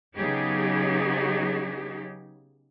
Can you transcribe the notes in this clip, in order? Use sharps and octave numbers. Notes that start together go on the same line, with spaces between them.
C#3 F#3 B3 D#4 G4 G#4